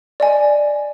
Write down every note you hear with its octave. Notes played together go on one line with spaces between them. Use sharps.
D5 D#5 G#5